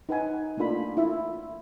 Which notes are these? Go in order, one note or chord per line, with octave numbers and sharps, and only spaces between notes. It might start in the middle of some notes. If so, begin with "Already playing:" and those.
D#4 B4 F#5 G#5
A3 A#3 D4 F4 B5
E4 F4 E5